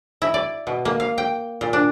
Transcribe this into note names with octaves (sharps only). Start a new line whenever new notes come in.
E4
D5
B2
A#3
F5
G5
A#2
D4